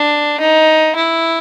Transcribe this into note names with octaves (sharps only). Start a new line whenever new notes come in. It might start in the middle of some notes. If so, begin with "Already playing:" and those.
Already playing: D4
D#4
E4